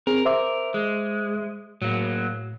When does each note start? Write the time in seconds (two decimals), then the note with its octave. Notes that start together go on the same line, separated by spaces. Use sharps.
0.07 C4 G#4 A#4
0.25 C5 E5 D6
0.74 G#3
1.82 A2 F#3 A#3